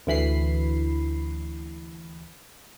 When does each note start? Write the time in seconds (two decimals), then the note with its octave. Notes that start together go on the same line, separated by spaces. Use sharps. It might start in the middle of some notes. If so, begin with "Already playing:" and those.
0.07 D2 E3 B5 C7